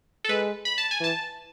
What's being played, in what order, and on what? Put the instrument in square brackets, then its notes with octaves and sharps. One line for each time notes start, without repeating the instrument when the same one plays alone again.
[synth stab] A4
[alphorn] G#3 [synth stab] B4
[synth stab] B5
A5
G#5
[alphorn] E3 [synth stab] A5